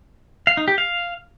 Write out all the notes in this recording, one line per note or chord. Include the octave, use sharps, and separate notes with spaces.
F5
D#4
G4
F5